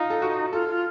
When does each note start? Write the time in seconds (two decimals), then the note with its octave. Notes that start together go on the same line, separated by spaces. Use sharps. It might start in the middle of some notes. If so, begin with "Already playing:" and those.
Already playing: D#4 F4
0.10 A4
0.22 F#4
0.53 F4 A4
0.69 F4